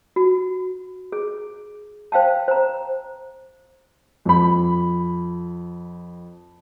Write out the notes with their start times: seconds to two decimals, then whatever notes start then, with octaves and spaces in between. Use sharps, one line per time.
0.16 F#4
1.12 G#4
2.12 C5 F5 G5 A5
2.48 C5 A#5
4.25 F2 B5